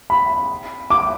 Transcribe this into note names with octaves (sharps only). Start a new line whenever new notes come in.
B5
D6